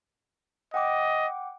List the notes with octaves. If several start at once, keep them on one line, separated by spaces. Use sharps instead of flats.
D#5 F#5 G5 D6